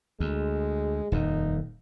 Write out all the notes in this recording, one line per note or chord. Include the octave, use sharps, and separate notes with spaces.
D2 G#3
D#1 F2 D#4